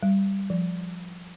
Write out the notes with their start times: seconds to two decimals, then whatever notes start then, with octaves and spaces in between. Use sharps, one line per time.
0.03 G3
0.50 F3